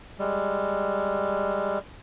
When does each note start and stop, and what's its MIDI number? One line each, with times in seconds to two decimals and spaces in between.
0.19 1.79 55
0.19 1.79 56